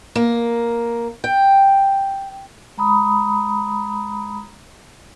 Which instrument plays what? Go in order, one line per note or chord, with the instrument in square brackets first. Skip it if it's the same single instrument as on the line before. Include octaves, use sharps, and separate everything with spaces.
[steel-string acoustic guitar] A#3
G5
[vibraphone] G#3 A#5 B5 D#6